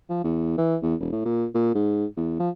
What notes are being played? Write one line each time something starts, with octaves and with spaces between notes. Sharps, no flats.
F3
E2
E3
E2
E1
A2
A#2
A#2
G#2
E2
F3